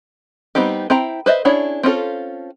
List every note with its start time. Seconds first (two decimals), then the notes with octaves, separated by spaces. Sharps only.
0.55 G3 B3 C4 D#4 G4
0.90 C4 E4 G5 A#5
1.26 B4 C5 D#5 E5
1.45 C#4 D4 E4 G#4 C#5
1.83 C4 C#4 F4 A4